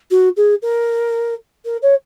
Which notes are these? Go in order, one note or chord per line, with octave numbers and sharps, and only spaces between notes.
F#4
G#4
A#4
A#4
C#5